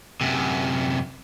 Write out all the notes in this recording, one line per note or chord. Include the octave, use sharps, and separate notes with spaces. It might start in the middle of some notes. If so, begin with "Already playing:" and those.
F#2 C3